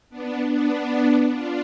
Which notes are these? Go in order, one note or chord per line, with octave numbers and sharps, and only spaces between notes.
B3 D4
B3 D4
D4 F4